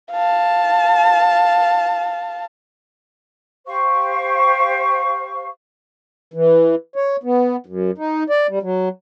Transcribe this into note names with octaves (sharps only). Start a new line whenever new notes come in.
F5 A5
G4 C5 F5 C#6
E3
C#5
B3
F#2
D#4
D5
G3
F#3